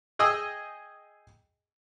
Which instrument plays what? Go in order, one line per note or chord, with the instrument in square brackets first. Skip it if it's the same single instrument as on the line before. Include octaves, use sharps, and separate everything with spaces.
[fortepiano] G#4 D#5 G5 G#5 D#6 E6